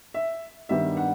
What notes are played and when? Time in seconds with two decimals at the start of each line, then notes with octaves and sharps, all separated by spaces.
0.14 E5
0.69 G2 D#3 G3 B3 D4 E5
0.97 F#5